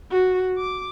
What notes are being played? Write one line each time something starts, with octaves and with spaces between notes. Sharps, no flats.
F#4
D6